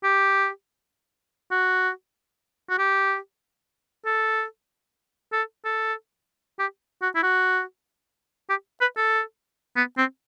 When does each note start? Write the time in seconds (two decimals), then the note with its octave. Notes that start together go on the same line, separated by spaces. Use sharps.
0.04 G4
1.51 F#4
2.70 F#4
2.79 G4
4.06 A4
5.32 A4
5.65 A4
6.59 G4
7.02 F#4
7.15 E4
7.23 F#4
8.50 G4
8.81 B4
8.97 A4
9.76 B3
9.98 C4